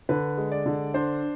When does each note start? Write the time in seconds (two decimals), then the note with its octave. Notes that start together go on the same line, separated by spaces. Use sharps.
0.09 D3 B4
0.37 G#3
0.52 D5
0.66 D3
0.94 D4 C5